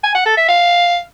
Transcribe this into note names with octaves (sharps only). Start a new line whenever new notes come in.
G#5
F#5
A4
E5
F5